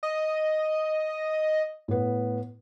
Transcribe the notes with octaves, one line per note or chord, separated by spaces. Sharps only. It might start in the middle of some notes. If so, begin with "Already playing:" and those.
D#5
A2 B3